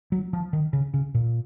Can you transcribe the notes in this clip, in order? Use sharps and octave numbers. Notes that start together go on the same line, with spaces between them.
F#3
F3
D#3
C#3
C#3
A#2